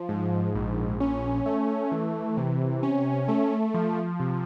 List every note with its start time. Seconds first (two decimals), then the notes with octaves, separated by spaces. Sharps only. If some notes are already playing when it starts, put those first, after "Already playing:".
Already playing: F3
0.09 G#2
0.55 A#1
1.00 C#4
1.46 A3
1.92 E3
2.37 C3
2.83 C#4
3.28 A3
3.74 F3
4.20 C3